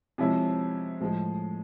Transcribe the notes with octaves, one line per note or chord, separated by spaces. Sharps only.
C3 F3 G#3 C#4 E4
A2 F3 G#3